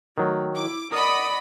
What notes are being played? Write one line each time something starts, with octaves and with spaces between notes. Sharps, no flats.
D#3 F#3 A3
E4 D6
A#4 D5 D#5 F#5 B5 D#6